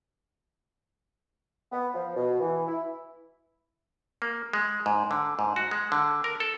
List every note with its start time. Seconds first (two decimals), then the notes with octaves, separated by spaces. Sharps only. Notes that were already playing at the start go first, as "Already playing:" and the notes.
1.72 B3
1.94 F3
2.16 B2
2.40 E3
2.67 E4
4.22 A#3
4.53 G#3
4.86 G#2
5.11 D3
5.39 G#2
5.56 F#4
5.71 G#3
5.92 D3
6.24 A#4
6.40 A4